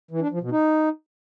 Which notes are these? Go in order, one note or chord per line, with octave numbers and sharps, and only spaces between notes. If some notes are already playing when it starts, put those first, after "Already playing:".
E3
D4
F3
B2
D#4